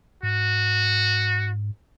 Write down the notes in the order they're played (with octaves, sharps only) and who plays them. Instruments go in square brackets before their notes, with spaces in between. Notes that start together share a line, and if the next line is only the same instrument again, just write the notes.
[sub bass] G#2 [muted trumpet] F#4